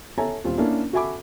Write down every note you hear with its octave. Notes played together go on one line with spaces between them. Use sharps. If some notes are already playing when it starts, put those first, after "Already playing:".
A4 C#5 E5 G#5 A#5
D#1 C4 F4
A#3 C#4 D4 E4
F#4 A4 E5 G#5 B5 D6